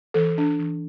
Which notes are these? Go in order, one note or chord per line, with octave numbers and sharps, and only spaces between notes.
E3 A4
D4
E3